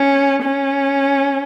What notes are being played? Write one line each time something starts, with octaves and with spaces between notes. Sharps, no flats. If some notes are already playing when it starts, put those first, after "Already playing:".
Already playing: C#4
C#4